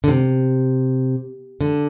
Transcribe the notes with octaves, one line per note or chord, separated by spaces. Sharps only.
D3
C3
D3